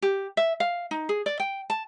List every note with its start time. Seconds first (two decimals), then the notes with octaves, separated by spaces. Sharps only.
0.02 G4
0.37 E5
0.60 F5
0.91 D#4
1.09 G#4
1.26 D5
1.40 G5
1.70 A5